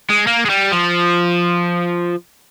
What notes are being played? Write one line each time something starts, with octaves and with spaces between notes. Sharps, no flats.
G#3
A#3
G#3
G3
F3